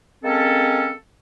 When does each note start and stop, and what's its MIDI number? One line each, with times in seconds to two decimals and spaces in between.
0.23 0.92 56
0.23 0.92 58
0.23 0.92 60
0.23 0.92 61
0.23 0.92 69